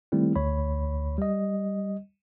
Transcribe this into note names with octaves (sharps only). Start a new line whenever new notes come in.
D#3 G3 A3 C4 E4
D2 C#5 B5
G3 D#5